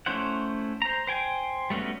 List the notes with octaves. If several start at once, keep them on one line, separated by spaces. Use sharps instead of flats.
A3 C#4 E4 C5 F#5
C5 A#5
C5 G5 G#5
G3 A3 B3 C#4 F#4